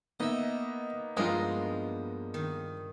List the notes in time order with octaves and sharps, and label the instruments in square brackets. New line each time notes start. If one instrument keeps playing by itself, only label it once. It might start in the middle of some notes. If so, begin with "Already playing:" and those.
[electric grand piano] A#3 B3 D#4 [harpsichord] D#5 E5
[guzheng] G2 A#4 [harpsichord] F3 [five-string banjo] G#3 F4
[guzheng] D#3